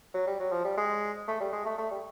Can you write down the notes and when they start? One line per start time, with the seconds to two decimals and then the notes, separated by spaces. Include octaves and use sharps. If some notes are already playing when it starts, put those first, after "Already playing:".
0.14 F#3
0.27 G3
0.40 F#3
0.52 F3
0.65 G3
0.77 G#3
1.28 A3
1.40 G3
1.53 G#3
1.66 A3
1.78 A3
1.91 G3